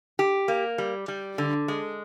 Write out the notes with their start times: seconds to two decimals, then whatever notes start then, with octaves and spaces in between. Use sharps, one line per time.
0.19 G4
0.48 A#3
0.78 G3
1.08 G3
1.38 D3
1.68 G#3